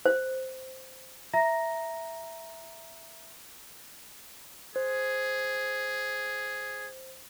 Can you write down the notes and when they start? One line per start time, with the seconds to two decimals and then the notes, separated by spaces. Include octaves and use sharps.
0.06 C5
1.33 E5 A#5 A#6
4.76 G#4 C5